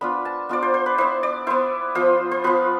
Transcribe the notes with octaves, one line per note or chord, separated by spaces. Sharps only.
B3 D4 F4 B5
A5
B3 D4 F4 D5
C5
C5
B4
B3 E4 C5
D5
B3 E4 C5
F3 B3 F4 C5
C5
F3 B3 F4 B4